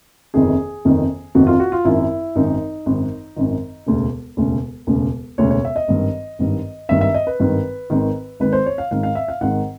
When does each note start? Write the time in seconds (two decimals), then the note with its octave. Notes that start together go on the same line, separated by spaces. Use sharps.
0.34 G1 F2 C3 D#3 G#4
0.85 G1 F2 C3 D#3
1.35 G1 F2 C3 D#3 F#4
1.47 F4
1.60 F#4
1.72 F4
1.85 G#1 F#2 D#3 E4
2.36 G#1 F#2 D#3 D#4
2.86 G#1 F#2 D#3
3.36 G#1 F#2 D#3
3.86 E1 D2 C#3
4.37 E1 D2 C#3
4.87 E1 D2 C#3
5.38 E1 D2 C#3 C#5
5.50 C#5
5.65 E5
5.76 D#5
5.88 G#1 G2 D#3
6.39 G#1 G2 D#3
6.89 G#1 G2 D#3 E5
7.01 E5
7.14 D#5
7.27 B4
7.40 G#1 G2 D#3
7.90 G#1 G#2 D#3
8.40 G#1 G#2 D#3 B4
8.53 C5
8.66 C#5
8.78 F5
8.91 G#1 G#2 D#3 F5
9.03 F5
9.15 E5
9.28 F5
9.41 G#1 G#2 D#3 F#5